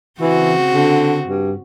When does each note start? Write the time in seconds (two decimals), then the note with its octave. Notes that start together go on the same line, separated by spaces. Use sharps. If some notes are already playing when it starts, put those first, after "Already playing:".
0.21 C#3 E3 C4 F#4
0.74 D3
1.27 G2